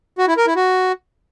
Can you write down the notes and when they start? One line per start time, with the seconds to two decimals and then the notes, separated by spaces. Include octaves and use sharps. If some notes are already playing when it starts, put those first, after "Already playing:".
0.18 F#4
0.28 E4
0.37 A#4
0.47 E4
0.56 F#4